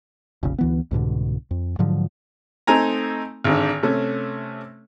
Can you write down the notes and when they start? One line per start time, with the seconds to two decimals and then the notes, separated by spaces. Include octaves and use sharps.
0.43 F1 A#1 C#3
0.58 D2 E3 B3
0.91 C2 G#2 B2 D3
1.51 F2
1.79 G#2 D3 F3 F#3
2.67 A3 C4 D#4 G#5 A#5
3.44 G#1 G#2 D3
3.83 C3 A3 C#4